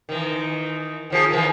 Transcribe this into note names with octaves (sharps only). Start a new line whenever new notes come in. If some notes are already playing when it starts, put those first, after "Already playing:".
D#3 E3
D#3 F3 G#4
D#3 E3